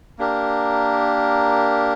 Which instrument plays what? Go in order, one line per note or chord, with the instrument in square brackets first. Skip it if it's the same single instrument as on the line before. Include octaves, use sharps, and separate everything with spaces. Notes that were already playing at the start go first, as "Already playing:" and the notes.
[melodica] A#3 D4 G4 A#4